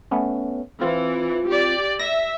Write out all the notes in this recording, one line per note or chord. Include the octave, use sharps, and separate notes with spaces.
A3 B3 C#4
E3 C4 F4
G4 D5
E5 A#6